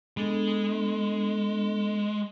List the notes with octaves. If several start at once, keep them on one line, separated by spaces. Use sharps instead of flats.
G#3 B3 D4 A4